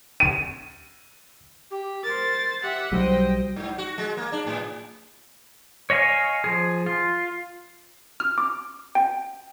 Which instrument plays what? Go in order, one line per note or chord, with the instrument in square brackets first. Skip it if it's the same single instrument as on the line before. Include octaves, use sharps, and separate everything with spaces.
[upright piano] D#7
[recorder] G4
[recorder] A#4 [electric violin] C5 A6
[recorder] G4 [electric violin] E5 F#5
[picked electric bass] B1 F#3 G3 [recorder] C5 [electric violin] D#5 G5
[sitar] G#2
F#4
G#3
A#3
D4
A2
[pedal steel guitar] C#5 D#5 F5 G#5 C#6
F3 G#4
F4
[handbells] F6
D6
G5